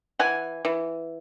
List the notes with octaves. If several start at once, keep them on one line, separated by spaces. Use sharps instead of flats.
E3 F#5 G#5
E3